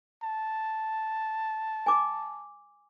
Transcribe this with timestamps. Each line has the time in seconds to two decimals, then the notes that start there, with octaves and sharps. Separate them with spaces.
0.23 A5
1.86 G#5 D6